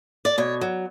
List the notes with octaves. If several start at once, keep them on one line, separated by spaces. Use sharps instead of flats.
D5
B2 C#5
F#3